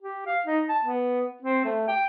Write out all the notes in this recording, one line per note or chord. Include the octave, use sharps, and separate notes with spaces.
G4
F5
D#4
A5
B3
C4
A3
G5